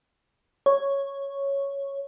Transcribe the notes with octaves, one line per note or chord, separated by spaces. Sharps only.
C#5